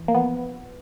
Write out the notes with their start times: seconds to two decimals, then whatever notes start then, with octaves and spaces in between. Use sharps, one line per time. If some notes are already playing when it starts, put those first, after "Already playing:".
Already playing: E3
0.08 A#3
0.14 F3 B3